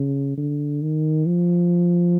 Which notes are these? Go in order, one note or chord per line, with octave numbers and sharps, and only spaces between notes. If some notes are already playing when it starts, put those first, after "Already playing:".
Already playing: C#3
D3
D#3
F3